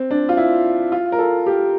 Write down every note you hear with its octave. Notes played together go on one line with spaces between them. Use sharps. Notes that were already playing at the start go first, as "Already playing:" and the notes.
Already playing: C4
D4
F4
E4
F4
A#4
A4
G4